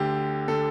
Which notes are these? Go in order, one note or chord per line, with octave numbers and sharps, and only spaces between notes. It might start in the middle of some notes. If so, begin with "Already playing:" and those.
Already playing: D2 D3 G4
D3 A4